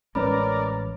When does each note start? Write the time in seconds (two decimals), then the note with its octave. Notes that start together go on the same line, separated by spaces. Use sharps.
0.15 A1 G#3 C#4 A#4 B4 C#5 D5 B5